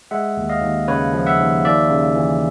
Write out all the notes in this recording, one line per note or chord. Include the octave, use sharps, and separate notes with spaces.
G#3 E5 F#5
D#2
D#5 F5
D#2
C#3 B4 C#5
F3
E5 F#5
D#2
D#2 D5 E5
C#3
E3